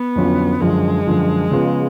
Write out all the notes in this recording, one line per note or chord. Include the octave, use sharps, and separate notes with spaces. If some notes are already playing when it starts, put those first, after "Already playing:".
Already playing: B3
F2 D3 F#3 C#4 F4
F#2 D3 F3 G#3
F#2 D3 F3
C#3 F3 B3 F4